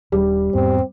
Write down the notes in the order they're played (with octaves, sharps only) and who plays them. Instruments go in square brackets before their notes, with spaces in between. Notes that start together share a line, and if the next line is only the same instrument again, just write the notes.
[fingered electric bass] D#1 D4 [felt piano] G3
[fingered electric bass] E2 G#2 B3 [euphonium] C4